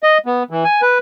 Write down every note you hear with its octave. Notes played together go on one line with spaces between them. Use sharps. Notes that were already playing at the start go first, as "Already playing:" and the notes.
D#5
B3
E3
G#5
B4